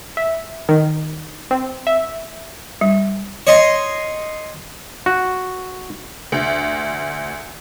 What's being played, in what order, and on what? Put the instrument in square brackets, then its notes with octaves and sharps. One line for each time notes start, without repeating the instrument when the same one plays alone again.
[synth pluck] E5
D#3
C4
E5
[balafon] G3
[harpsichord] C#5 D#5 C6
[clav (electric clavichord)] F#4
[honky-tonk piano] D2